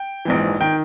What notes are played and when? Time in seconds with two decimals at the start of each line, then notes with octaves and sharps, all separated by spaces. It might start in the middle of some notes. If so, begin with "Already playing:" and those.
Already playing: G5
0.25 A#1 G#2 E3
0.61 D#3 G5